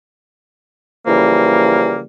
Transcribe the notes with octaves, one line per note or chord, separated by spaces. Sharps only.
C#3 E3 F3 G3 A#3